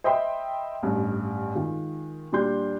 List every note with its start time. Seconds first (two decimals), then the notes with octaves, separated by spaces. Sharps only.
0.04 C5 D#5 E5 G5 B5 C6
0.83 A1 G2
1.55 D#3 G#3 F4
2.32 A#2 G3 D4 C6 G6